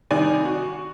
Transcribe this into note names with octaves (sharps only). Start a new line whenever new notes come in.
C2 D#3 D#4 D5 G#5
F#4